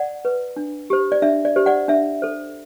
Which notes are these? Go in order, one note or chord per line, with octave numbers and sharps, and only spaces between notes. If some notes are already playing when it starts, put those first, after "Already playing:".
Already playing: D5 F#5
B4
D4
G4 C5
D5
D4 E5
D5
G4 C5
D5 F#5
D4 E5
A4 C5